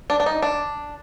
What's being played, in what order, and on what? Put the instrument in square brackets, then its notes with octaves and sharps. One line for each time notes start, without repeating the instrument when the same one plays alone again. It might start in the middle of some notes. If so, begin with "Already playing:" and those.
[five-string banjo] D4
D4
D#4
D4